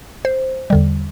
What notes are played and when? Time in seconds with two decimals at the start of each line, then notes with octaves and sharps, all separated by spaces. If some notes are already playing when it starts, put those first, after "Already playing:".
0.25 C5
0.70 E2 D3 G3